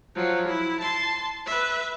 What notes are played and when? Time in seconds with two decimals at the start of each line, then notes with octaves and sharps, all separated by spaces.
0.15 F3 F#3
0.48 E4
0.81 A5 C6
1.46 B4 E5